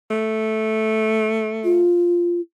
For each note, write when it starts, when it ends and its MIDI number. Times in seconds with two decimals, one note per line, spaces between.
0.11 1.88 57
1.64 2.41 65